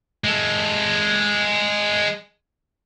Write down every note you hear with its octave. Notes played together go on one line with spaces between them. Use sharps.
G#3 A4